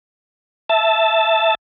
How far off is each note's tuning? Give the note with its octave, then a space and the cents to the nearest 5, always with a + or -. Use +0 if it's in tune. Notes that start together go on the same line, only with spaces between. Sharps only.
E5 +0 A5 +0